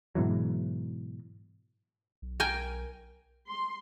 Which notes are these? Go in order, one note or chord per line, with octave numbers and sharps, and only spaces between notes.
G#2 B2 E3 F#3
B1
A#4 G5 G#5
C6